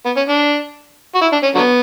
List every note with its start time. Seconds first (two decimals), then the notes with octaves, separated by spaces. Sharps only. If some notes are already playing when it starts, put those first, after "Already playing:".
0.05 B3
0.16 C#4
0.28 D4
1.15 F#4
1.21 E4
1.32 D4
1.43 C#4
1.55 D3 F#3 B3